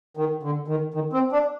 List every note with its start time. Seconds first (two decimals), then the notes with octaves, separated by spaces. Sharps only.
0.17 D#3
0.43 D3
0.68 D#3
0.94 D#3
1.13 C4
1.33 D4